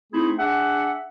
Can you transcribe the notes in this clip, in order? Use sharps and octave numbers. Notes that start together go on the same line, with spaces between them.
A3 C4 D#4 E4 G#4
D4 G#4 E5 F#5